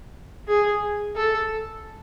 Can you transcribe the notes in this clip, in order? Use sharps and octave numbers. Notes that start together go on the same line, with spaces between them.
G#4
A4